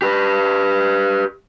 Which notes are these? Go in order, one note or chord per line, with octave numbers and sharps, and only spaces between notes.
G4 B4